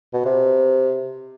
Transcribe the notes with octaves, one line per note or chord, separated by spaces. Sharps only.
B2
C3